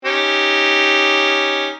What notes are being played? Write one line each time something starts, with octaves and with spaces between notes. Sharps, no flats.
C#4 D#4 G4